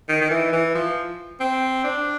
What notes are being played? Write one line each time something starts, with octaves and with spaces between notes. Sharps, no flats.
D#3
D#3
E3
E3
F3
C4
D4